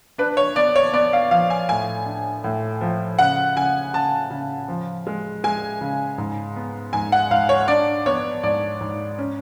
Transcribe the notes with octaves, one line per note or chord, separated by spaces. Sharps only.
D4 B4
C#5
B3 D5
C#5
B3 D5
F5
F3 F5
G#5
A2 G#5
D4
A2
F3
C#3 F#5
C#3 G#5
C#3 A5
C#3
F3
G#3
G#3 G#5
C#3
G#2
B3
G#2 G#5
F#5
G#2 F5
C#5
D4 D5
B3 C#5
G#2 D5
G#2
C#4